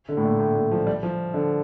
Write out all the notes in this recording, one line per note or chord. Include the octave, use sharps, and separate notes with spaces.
D3
A2
A#2
A2
A#2
F3
G3
F3
D3